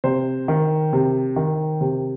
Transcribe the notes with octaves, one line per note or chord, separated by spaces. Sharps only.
C3 C5
D#3
C3
D#3
C3